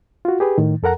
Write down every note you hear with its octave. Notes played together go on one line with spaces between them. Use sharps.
F4 F#4
G4 G#4 B4
A2 D#3
F2 A4 A#4 F#5 A#5